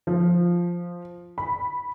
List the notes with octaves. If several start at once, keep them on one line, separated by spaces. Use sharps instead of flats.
F3
B5